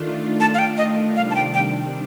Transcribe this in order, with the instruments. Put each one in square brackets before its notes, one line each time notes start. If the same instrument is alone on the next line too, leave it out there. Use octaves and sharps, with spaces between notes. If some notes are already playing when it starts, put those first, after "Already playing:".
Already playing: [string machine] D#3 A3 D4 F4
[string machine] D#3 A3 D4 F4 [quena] A5
[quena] F5
G5
D#5
[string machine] C3 D#3 G3 D4 [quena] F5
[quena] A5
G5
G5